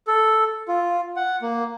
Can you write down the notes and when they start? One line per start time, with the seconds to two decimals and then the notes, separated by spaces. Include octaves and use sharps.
0.07 A4
0.68 F4
1.16 F#5
1.42 A#3